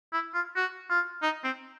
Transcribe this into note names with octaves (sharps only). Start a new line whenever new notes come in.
E4
F4
F#4
F4
D#4
C4